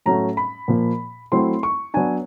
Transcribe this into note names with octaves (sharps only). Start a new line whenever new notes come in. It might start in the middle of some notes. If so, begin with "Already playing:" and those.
A2 F#3 A3 C#4 A#5
B5
A#2 F3 A#3
F#3 A3 C4 E4 C6
C#6
F#3 B3 D4 G#5